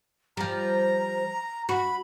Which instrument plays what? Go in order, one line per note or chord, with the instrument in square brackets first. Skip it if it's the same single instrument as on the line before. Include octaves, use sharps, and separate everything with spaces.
[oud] F3 G3 [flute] A#5
[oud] F#4 [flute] B5